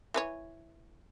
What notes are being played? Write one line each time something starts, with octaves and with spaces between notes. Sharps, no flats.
E3 B4 C#5